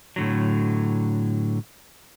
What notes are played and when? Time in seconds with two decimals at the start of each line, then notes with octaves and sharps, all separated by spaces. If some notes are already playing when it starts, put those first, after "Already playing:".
0.16 A2 D3 F#3